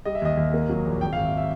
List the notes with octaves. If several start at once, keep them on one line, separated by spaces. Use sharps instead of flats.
G3 D#5
E5
D#2 D#5
D#2
A#3
F#3
A#1
G#1 G5
G#1 F5
E5
E5